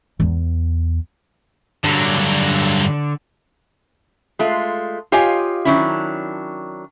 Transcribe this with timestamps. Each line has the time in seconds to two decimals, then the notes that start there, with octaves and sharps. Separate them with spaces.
0.20 E2 B3
1.84 G2 D3 F#3
4.39 G#3 A3 F4
5.12 F4 G4 C#5 D#5 F5 G#5
5.65 D#3 F#3 C#4 D4 E4